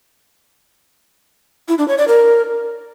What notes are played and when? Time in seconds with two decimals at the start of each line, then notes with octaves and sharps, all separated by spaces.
1.69 E4
1.78 D4
1.88 C#5
1.98 D5
2.08 A#4